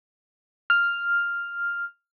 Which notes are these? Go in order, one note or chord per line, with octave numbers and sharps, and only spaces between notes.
F6